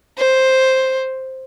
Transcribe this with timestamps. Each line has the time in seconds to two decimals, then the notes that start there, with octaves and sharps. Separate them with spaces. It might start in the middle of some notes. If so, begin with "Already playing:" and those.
0.18 C5